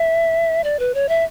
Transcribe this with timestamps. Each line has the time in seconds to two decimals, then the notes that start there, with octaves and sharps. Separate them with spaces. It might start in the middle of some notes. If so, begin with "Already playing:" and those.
Already playing: E5
0.64 D5
0.79 B4
0.94 C#5
1.09 E5